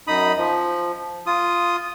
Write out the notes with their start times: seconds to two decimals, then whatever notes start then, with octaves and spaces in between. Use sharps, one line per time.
0.07 F#2 D#4 B5 D#6
0.38 F3
1.26 F4 D#6